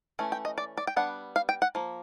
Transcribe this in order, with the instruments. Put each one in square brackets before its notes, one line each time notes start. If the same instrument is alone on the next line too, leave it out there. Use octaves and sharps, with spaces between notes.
[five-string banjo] E3 A3 C#4
G5
D#5
D5
D5
G5
G3 B3 D4 F#5
F5
G5
F#5
F3 A#3